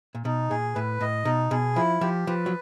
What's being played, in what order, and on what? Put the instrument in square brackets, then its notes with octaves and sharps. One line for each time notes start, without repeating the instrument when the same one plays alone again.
[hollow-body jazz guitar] A#2
[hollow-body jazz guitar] B2 [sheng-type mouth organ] D#4
[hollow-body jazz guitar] A#2 [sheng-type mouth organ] G#4
[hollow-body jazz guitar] A2 [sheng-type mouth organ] B4
[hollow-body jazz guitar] A2 [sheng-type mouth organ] D#5
[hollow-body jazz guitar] B2 [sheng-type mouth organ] D#4
[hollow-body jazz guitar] B2 [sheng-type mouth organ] G#4
[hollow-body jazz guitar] F3 [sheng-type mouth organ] E4
[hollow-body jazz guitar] F3 [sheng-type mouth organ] G4
[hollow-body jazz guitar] F3 [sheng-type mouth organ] B4
[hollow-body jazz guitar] F#3